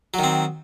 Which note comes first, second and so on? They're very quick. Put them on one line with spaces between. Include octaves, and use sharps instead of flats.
F#3 D#3 C4